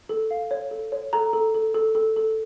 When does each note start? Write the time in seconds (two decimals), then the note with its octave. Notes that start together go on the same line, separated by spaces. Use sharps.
0.09 A4
0.31 F5
0.51 C#5
0.71 A4
0.92 C#5
1.13 A4 A#5
1.33 A4
1.54 A4
1.74 A4
1.95 A4
2.16 A4